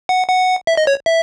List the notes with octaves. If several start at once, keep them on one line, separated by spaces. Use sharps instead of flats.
F#5
F#5
E5
D#5
C#5
E5